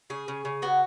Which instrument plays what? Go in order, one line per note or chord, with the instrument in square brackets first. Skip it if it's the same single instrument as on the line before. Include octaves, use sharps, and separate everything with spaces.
[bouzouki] C#3 G#4
C#3
C#3
B3 F#4